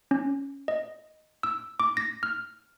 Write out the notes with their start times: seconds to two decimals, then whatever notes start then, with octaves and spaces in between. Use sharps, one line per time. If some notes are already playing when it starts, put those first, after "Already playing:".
0.11 C#4
0.68 D#5
1.43 E6
1.80 D6
1.97 A#6
2.23 F6